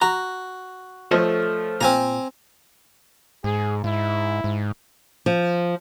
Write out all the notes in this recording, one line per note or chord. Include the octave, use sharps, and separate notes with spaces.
F#4 A#5
F3 A3 A4 C#5 D#5
A#2 C4 G#5 A#5
G#2 G#4
G#2 E4
G#2
F3